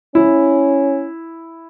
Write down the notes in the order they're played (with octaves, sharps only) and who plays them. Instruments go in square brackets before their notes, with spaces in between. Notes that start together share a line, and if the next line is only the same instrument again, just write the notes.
[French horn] C#4 [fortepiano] E4